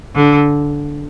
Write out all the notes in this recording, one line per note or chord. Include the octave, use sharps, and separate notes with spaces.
D3